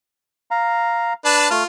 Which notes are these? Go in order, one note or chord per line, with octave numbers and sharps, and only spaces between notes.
F5 A#5
D4 B4 A5
A3 F4 F6